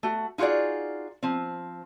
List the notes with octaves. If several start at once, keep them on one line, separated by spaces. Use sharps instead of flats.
A3 F#4
D#4 F4 F#4 G#4 D5
F3 C4